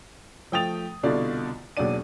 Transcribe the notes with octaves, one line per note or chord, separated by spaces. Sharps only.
F3 A3 G5 D#6 A6 F7
C2 B2 D3 F4 D5
E1 D#2 F#3 D4 D5 D#7